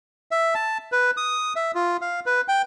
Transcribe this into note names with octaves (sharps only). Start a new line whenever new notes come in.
E5
A5
B4
D#6
E5
F4
F5
B4
G5